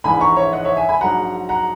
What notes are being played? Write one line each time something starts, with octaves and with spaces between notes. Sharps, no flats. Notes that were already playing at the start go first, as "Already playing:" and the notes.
A#1 G#2 E3 G#5 B5
A#5 C#6
C#5 E5
D#5 F#5
C#5 E5
E5 G#5
G#5 B5
A#1 G#2 F#3 F#5 A#5
F#5 A#5